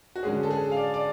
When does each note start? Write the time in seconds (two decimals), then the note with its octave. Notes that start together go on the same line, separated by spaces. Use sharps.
0.15 F#4
0.23 D3 G#3 C#4 G#4
0.43 A4
0.51 G#4
0.71 F5
0.76 D5
0.94 D5